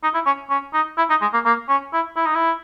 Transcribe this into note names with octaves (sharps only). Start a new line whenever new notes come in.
D#4
E4
C#4
C#4
D#4
E4
D#4
G#3
A#3
A#3
C#4
E4
E4
D#4
E4